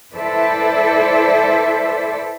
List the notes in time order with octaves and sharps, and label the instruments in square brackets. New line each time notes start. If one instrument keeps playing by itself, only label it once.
[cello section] E4 A4 B4 C5 D5 E5